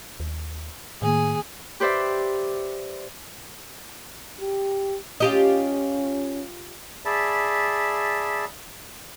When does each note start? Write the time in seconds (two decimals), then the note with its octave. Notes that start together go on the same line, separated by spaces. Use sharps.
0.20 D#2
1.02 A2 D#3 A#3 G#4
1.80 G4 B4 C5 D5 E5
4.40 G4
5.20 C#4 F4 G4 D#5
7.05 G#4 D5 E5 A5 B5